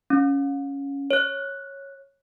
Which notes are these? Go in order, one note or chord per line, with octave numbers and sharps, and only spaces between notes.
C#4
C#5 F#6